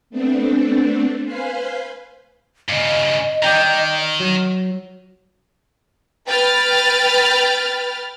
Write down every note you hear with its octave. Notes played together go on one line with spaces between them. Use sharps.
A3 B3 C4 D4
B4 C5 F5 G#5 B5 C6
G2 C#3 D#5
D#3 D5 G5 A#5
F#3
B4 G5 B5 F6 A6